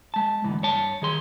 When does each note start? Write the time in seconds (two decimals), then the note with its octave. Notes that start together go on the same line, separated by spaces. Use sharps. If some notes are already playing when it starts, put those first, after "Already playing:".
0.14 G#3 A5
0.44 D2 G#2 E3
0.62 G2 C#5 A5
1.02 D#3 G#4 C6